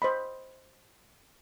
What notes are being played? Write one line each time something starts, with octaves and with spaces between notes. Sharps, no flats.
C5 D#5 B5